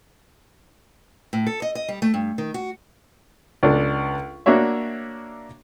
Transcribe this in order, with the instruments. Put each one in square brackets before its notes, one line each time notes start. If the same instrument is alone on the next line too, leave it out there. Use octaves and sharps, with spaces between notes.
[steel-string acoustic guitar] A2
A4
D#5
D#5
G3
A3
G2
D#3
F#4
[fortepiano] C#2 D4 A4
A#3 D4 F#4 C#5 E5